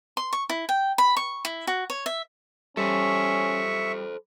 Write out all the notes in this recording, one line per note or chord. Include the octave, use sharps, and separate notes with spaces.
C6
C#6
E4
G5
B5
C#6
E4
F#4
C#5
E5
G3 C#4 A4 C5 E5 C#6